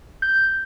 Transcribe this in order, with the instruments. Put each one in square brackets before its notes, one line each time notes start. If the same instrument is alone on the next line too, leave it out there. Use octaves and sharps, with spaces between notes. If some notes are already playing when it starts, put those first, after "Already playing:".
[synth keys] G6